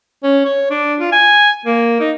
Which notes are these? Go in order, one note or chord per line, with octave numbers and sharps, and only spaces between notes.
C#4
C#5
D4
F4
G#5
A#3
D#4